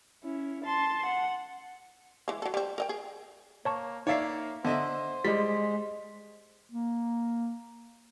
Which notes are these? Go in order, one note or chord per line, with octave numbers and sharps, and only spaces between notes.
C#4 E4
A5 C6
F#5
E3 G#3
F#3 A4
G3 C4
A#4 D#5 G5
G#4
A#3 C#5 A5 C#6
A#3 D#4 C#5 D5 E5 F5 C7
D3 B3 C5 D#5 E5
G3 G#3 A6 B6
A#3